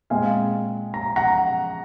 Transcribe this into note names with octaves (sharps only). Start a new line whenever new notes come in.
A#2 G#3 C4 F5 G#5
A#5
F#5 A#5